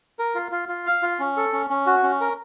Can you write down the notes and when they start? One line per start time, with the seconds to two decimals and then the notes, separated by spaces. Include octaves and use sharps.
0.19 A#4
0.35 F4
0.52 F4
0.69 F4
0.86 F5
1.02 F4
1.20 C#4
1.37 A4
1.53 C#4
1.70 C#4
1.86 F#4
2.03 C#4
2.21 A#4